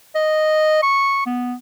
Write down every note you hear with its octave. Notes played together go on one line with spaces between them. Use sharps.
D#5
C#6
B3